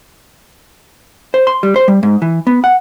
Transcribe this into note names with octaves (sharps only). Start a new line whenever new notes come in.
C5
C6
G3
C5
G3
G#2
E3
B3
F#5